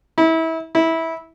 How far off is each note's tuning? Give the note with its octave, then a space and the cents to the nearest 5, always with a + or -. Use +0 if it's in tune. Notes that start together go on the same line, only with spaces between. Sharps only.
E4 -25
E4 -15